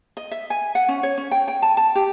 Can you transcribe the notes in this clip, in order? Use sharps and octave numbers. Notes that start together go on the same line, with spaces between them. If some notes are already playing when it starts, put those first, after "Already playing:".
D#5
E5
G#5
F#5
C#4
C#5
C#4
G5
G5
A5
A5
G4